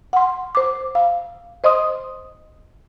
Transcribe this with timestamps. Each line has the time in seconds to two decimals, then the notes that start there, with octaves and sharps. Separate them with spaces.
0.13 F#5 C6
0.55 C5 D6
0.95 F5
1.64 C5 D#5 C6 D#6